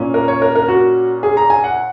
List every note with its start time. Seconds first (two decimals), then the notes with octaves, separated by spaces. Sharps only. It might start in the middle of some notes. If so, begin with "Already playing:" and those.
Already playing: A#2 A#3 C#4
0.14 A#4
0.28 C#5
0.42 A#4
0.55 A#4
0.68 F#4
1.23 G#4
1.37 A#5
1.50 G#5
1.64 F#5